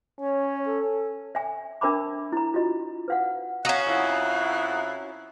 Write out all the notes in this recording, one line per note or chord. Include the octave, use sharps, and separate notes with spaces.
C#4 C#5
A4
E5 G#5
D4 A#4 E5 A5 B5 D6
E4 A#5
F4 F#4 D#5
B4 F5 F#5
C#4 F#4 F5 F#5 A#5 D#6 F#6
F2 E4 F5 F#6